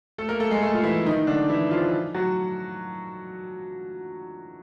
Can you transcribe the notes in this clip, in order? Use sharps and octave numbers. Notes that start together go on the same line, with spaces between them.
A3 A4
A#3 A#4
A3 A4
G#3 G#4
A3 A4
F4
E3 E4
D#3 D#4
D3 D4
E3 E4
F3 F4
F#3 F#4